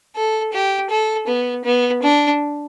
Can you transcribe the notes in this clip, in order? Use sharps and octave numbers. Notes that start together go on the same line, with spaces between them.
A4
G4
A4
B3
B3
D4